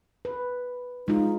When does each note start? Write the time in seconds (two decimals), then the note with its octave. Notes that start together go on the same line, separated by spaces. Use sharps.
0.25 B4
1.08 G#3 D#4 F4